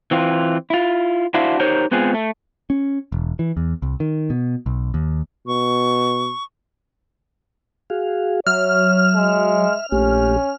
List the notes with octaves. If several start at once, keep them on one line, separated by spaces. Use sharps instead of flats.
E3 C4 F4
E4 F4
D4 E4 F#4 C5 E5 F5
D#4 G4 A#4 C5 C#5
G#3 B3 C4 F4 G#4
A3
C#4
E1
E3
E2
C2
D#3
B2
B1
D#2
B2 C#6
F#4 G#4 F5
F#3 C#5 E5 F6
G#3
A#1 A3 C#4 G4